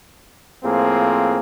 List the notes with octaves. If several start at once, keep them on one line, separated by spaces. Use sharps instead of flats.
A2 F3 A#3 C4 G#4